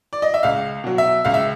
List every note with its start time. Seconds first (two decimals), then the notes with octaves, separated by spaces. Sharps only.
0.13 D5
0.22 D#5
0.34 E5
0.43 C#2 F5
0.84 B2 F#3
0.98 E5
1.25 C#2 F5
1.34 E5